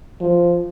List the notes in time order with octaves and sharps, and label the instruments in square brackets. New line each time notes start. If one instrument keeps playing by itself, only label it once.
[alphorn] F3